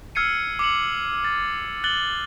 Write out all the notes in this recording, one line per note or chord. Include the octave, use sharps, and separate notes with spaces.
E6 F6 G#6 C7 C#7 D#7
D6 C#7 F#7
A6
F#6 A6 F#7 G7